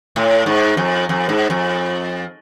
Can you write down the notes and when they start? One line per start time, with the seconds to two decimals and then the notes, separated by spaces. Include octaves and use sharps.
0.16 A2
0.46 G#2
0.77 F2
1.09 F2
1.29 G#2
1.50 F2